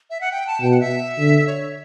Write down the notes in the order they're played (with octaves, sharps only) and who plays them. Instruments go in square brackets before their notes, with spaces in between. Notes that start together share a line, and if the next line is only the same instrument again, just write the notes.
[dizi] E5
F#5
G5
A5
[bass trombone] B2 [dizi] G5
[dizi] F#5
E5
[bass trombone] D3
[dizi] C#5